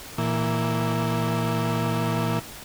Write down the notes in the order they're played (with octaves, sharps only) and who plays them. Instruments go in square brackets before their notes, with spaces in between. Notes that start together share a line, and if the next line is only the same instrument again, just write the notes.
[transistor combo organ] A#2 E3